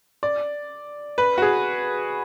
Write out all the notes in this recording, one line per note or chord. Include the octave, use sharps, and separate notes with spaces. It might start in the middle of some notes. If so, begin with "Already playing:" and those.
D5
B4
F#4
G#4